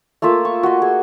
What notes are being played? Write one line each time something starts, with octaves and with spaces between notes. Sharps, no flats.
A3 A#3 F4 E5
C#6
F#4 D#5
G#4